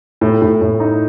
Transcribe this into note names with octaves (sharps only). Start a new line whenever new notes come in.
A2
A2
A2
D#4